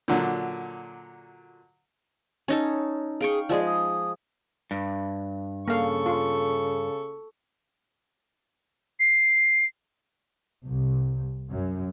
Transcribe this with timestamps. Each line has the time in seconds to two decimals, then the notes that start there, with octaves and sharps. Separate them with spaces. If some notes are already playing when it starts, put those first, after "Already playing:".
0.08 A#2 D3 F#3
2.48 C#4 D#4 A4
3.21 G#4 F5 G5 C#6
3.49 F3 G#3 G#4 D5
3.66 D#6
4.71 G2
5.68 C#3 A#3 A4 F5 C#6
6.06 F4
9.00 C7
10.64 C2
11.52 F#2